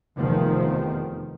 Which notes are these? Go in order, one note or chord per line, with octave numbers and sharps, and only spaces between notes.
F1 E2 D#3 F3